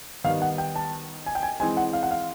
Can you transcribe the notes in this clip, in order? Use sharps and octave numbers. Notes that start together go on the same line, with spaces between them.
D#3 G3 B3 F5
F#5
G5
A5
G#5
G5
G#5
E3 G#3 C4 G#5
F#5
F5
F#5
F5